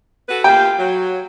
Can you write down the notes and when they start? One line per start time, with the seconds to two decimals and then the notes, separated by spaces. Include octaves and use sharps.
0.28 F#4 A4 B4
0.44 A#3 F4 G4 G5
0.79 F#3